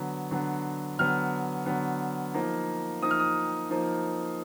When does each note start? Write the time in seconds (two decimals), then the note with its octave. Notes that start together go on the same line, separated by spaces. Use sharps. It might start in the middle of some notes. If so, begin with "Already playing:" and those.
Already playing: D3 F#3 B3
0.31 D3 F#3 B3
0.99 D3 F#3 B3 F6
1.66 D3 F#3 B3
2.34 F3 A#3 D#4
3.02 F3 A#3 D#4 D#6
3.11 F6
3.20 D#6
3.70 F3 A#3 D#4